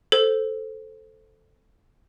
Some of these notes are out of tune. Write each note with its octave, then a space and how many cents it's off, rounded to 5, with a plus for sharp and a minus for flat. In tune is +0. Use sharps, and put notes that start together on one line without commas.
A4 +0 C5 +0